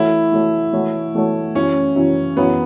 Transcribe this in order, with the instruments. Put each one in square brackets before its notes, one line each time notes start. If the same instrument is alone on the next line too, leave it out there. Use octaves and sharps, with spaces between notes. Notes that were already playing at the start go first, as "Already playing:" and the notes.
Already playing: [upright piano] E3 A3 F#4 A4 C#5 [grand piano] E4
[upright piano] E3 A3 F#4 A4 C#5
E3 A3 F#4 A4 C#5
E3 A3 F#4 A4 C#5
[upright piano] F#2 C#3 E3 [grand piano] C#4
[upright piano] F#2 C#3 E3
[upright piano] F#2 C#3 E3 [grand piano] B3